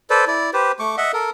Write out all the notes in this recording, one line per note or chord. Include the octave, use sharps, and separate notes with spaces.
A4 B4 C5 D5
E4 D5
G4 B4 C5
A3 C#6 D6
D#5 E5 F#5
A4 A#4